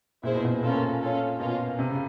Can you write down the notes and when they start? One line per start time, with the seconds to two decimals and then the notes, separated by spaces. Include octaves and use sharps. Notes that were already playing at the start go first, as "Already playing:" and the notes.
0.23 A#2 E4 G#4 C5
0.34 B2
0.45 A#2
0.62 A#2 A#3 C#4 F4 A4
1.01 C#4 F4 A4
1.40 B2 A#3 C#4 F4
1.79 C3
1.90 C#3